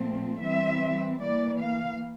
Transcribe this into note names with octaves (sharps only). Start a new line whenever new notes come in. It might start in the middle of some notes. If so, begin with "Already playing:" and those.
Already playing: A#2 F3 A3 C4
E3 G3 C4 E5
E3 A#3 D5
F5